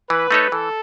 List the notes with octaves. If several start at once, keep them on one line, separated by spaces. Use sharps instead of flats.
E3 B4
A3 D#4 A4 C#5
E3 A4